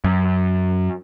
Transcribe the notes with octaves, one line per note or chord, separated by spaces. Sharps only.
F#2